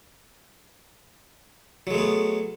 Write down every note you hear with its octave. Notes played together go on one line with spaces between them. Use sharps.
F#3 G#3 A3 B3